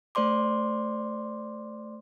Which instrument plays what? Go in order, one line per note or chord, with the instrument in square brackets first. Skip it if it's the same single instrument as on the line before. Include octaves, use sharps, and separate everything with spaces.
[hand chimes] A3 C5 D5 C6 D6